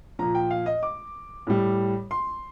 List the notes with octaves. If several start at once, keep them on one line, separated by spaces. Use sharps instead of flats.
A#2 F3 A#5
G5
F5
D#5
D6
A2 G3
C6